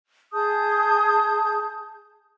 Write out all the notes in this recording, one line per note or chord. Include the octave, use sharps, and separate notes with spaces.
G#4 A5 D#6 G6